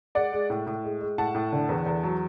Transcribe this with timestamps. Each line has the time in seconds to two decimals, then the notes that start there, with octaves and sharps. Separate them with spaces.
0.15 G#3 D5 F#5
0.32 G#3
0.50 A2
0.67 A2
0.84 G#3
1.01 G#3
1.18 A2 F#5 A5
1.35 A2
1.53 D3
1.69 E2
1.86 E2
2.03 F#3